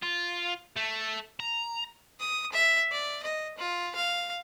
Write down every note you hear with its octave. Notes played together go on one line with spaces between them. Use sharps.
F4
A3
A#5
D#6
E5
D5
D#5
F4
F5